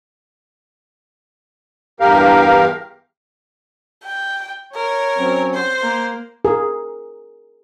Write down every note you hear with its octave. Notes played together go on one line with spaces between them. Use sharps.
E2 G2 G4 A#4 F5
G5
A#4 C#5
F#3 C4 C#4
C5
A#3 A#5
G#4 A#4